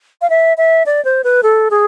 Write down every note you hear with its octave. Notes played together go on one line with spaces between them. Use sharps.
F5
E5
E5
D5
C5
B4
A4
G#4